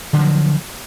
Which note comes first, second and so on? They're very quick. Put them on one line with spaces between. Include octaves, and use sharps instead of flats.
D3 D#3 F3 F#3